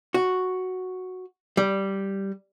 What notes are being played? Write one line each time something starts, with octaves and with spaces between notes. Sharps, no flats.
F#4
G3